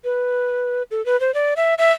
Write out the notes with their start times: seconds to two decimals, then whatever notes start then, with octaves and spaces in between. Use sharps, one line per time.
0.04 B4
0.91 A4
1.06 B4
1.20 C5
1.34 D5
1.57 E5
1.78 E5